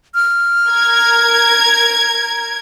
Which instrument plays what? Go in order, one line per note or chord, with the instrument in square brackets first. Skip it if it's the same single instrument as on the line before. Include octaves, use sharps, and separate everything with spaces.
[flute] F6
[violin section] A#4 G#6